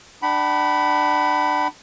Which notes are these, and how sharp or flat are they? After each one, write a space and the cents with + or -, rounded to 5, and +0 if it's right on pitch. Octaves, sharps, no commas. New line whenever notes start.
D4 +25 F#5 +45 B5 +0